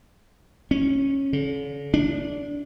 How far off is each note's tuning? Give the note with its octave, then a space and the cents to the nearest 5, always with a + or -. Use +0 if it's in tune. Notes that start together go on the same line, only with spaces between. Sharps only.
C#4 -15
D3 -45
D4 -20